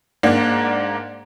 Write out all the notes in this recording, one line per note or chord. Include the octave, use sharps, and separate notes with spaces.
G#2 A#3 D4 F#5